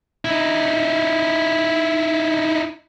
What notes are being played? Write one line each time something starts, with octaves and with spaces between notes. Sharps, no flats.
D#4 E4